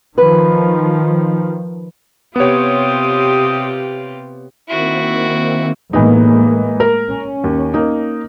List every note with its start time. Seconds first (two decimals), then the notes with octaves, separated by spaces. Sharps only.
0.18 D#3 F3 B4
2.36 C3 B3 F4 G4 C#5 D#6
4.69 D#3 A#3 C4 E4 F#4
5.93 A2 E3 G#3 A#3 B3 D#4
6.80 A#4
7.11 C#4
7.44 D#2
7.74 A#3 D#4